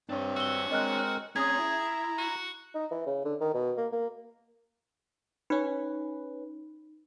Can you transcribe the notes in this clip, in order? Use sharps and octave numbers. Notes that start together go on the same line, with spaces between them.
G2 C4 D4 C#5
F#4 E6 G7
G#3 C4 A#4 D#5 F6 F#6
C4 C#4 G#4 A#5 D#6 G#6
E4
F#4
D#4
E3
C#3
D3
D#3
B2
A#3
A#3
C#4 D#4 B4